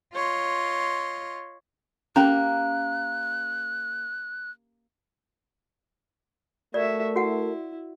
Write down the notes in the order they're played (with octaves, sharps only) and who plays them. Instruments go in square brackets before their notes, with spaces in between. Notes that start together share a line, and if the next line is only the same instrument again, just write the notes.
[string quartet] F4 C#5 D#5 C6
[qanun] A#3 G4 [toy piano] C#4 A#5 [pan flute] F#6
[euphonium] A3 [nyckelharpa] F#4 E5 [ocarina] A#4 [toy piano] D5
[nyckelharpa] E4 [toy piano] F#4 F#5